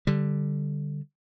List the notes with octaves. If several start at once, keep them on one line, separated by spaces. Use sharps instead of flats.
D3 G3